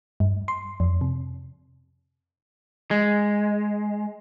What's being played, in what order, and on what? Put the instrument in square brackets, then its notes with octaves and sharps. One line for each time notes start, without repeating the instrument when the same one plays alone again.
[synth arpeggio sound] G2
C6
F2
C3
[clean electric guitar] G#3